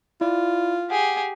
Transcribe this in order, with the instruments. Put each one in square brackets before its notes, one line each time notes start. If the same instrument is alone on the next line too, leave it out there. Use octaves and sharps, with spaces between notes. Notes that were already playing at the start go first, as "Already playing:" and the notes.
[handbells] E4 D5 [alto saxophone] F4
[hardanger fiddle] G4 G#4 [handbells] F#5